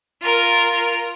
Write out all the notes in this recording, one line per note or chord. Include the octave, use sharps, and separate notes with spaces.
F4 A#4